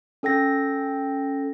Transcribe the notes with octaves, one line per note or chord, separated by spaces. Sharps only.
C#4 A4 G5 A#6